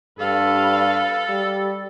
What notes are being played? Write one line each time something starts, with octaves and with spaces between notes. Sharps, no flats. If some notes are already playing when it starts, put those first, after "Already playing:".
G2 A4 B4 F5
G3